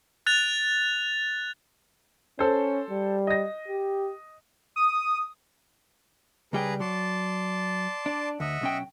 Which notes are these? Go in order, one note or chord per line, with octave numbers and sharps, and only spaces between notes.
F#6 A6 F7
C#4 A4 C5
G3
D#5 A#6
G4
D#6
C#2 G3 G#4 B4 G5 A#5
F#3 D5 A5 C6
D4
D2 D#5 E5 F#5
B1 C#4 G5